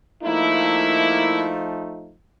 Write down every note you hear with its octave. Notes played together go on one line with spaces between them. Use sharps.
F3 A3 A#3 D#4 E4